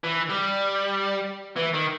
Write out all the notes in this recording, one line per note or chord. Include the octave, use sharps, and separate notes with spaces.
E3
G3
E3
D#3